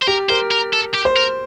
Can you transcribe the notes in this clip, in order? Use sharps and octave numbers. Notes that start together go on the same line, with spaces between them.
C5
G4 A#4
A#4 C5
A#4
A4
G4
C5
A#4